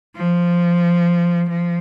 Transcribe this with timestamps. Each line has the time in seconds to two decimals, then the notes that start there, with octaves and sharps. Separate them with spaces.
0.17 F3
1.49 F3